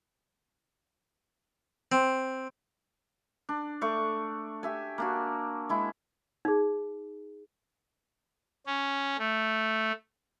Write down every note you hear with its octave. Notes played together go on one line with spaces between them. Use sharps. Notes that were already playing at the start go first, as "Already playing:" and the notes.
C4
D4
A3 D4 C#6 D6
G4 E5 G#5
A#3 D4 F#4
G#3 E4
D#4 G#4
C#4
A3